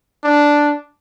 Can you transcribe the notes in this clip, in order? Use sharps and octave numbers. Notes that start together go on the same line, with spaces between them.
D4